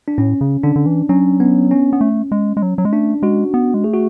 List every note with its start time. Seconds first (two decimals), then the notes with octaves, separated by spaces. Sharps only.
0.08 D4
0.18 A2 C#4
0.41 C#3
0.64 D3 D4
0.76 D3
0.86 E3
1.09 F#3 C#4
1.40 B3
1.71 C#4
1.93 B3
2.01 A3
2.32 G#3
2.57 G#3
2.62 F#3
2.78 F#3
2.85 G#3
2.93 A3 D4
3.23 G#3 F#4
3.54 B3
3.74 G#3
3.84 A3 G#4
3.94 F#4